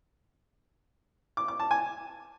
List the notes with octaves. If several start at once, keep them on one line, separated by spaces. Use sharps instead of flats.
D6
D6
A5
G#5